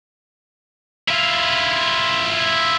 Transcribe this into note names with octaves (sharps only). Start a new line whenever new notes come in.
E4 F4